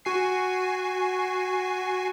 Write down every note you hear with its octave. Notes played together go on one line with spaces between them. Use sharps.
F#4 G#5 C7